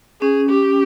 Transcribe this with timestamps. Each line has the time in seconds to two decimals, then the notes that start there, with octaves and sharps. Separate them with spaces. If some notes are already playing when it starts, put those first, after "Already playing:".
0.21 C#4 G#4
0.49 G4